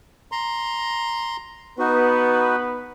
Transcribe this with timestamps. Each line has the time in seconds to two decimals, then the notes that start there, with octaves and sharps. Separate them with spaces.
0.32 A#5 C6
1.79 B3 D#4 F#4 B4